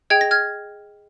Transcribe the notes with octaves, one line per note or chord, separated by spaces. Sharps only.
G#4 D#5 G5 G#6
A#6
F6 G#6